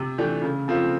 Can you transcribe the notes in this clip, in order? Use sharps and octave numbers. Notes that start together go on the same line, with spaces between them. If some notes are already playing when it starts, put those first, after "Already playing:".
Already playing: C3
E3 A3 D4 G4
C#3
F3 A3 C4 F4